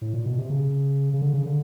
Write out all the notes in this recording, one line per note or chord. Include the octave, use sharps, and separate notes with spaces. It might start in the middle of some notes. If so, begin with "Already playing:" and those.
A2
A#2
B2
C3
C#3
C#3
D3
C#3
D3